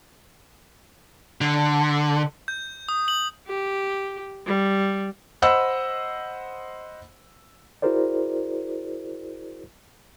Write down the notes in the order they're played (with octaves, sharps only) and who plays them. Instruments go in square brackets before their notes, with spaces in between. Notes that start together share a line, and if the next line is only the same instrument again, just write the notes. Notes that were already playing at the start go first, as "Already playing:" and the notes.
[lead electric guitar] D3
[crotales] G6
D#6
F#7
[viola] G4
G3
[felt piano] C5 D#5 F#5 B5 E6
[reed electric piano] E4 F#4 G#4 A#4 C5 D5